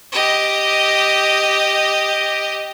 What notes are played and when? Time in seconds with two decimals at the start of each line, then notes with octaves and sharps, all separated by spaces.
0.12 G4 D#5